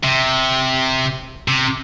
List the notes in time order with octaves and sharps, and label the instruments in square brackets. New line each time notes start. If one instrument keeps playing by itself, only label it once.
[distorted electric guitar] C3
C3